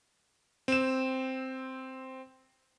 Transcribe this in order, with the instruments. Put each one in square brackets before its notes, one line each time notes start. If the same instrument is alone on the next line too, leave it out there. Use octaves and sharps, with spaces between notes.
[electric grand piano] C4 E7